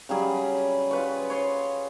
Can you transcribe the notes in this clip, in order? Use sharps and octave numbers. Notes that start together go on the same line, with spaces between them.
C#3 F#3 G3 G#4
F4 B4 C#6
C#5 C6